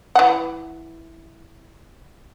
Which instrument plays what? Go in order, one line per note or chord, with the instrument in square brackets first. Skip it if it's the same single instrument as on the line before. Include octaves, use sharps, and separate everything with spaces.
[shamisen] E3 F#5